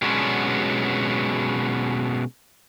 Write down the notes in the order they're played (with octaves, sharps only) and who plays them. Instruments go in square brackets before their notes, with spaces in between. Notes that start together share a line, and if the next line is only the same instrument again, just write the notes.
[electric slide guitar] B2 F#3 G#3 B3 C#4 D4